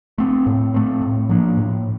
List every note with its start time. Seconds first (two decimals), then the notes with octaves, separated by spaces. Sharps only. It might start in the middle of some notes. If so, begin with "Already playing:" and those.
0.18 A3 C4
0.47 A2
0.74 A3 C4
1.02 A2
1.29 F3 A#3 D4
1.57 A2